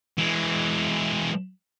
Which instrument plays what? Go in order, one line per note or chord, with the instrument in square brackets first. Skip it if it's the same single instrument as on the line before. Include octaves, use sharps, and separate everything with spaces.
[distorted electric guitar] E3 G#3